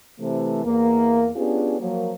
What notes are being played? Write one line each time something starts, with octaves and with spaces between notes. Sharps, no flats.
C3 E3 A3
E2 A#3
B3 C#4 D4 F4 G4 G#4
F3 F#3 A#3